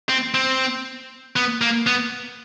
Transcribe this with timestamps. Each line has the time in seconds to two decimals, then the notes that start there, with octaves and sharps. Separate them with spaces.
0.09 C4
0.34 C4
1.36 B3
1.61 A#3
1.87 B3